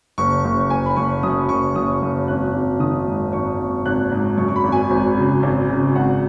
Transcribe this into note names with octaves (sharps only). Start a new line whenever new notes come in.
F#1 C#6
F#1
F#1 G#5
B5
F#1 C#6
F#2 D#6
F#1 C#6
F#1 D#6
F#1
G#1 F#6
G#1
D#3 D#6
G#2
G#1 C#6
G#1
G#1 F#6
G#2
F#2 C#6
C#6
B5
G#1
G#5
G#1
C#3
G#1
C#3
G#1 F#5